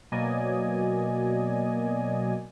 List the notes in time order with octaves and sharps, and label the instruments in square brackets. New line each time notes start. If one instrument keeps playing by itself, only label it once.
[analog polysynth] B2 F#3 A#3 D5 D#5 G#5